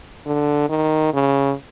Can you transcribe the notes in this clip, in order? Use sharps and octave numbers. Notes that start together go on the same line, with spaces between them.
D3
D#3
C#3